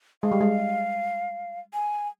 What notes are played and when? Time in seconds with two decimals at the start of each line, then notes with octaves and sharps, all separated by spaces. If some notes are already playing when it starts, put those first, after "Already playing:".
0.23 G#3 F5
0.32 G3
0.41 G#3
1.74 G#5